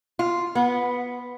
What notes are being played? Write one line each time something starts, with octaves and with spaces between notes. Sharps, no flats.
F4
B3